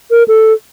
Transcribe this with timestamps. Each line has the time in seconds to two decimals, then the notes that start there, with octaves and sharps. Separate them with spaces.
0.11 A#4
0.28 A4